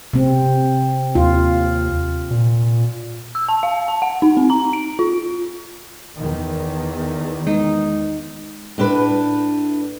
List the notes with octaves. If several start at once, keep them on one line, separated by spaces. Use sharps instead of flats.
C3 C4
D#2 F4
A#2
E6
A5
F5
A5
F#5
D#4
C4
A#5
D7
F4
E2 D#3
G#3 D#4
A2 D4 B4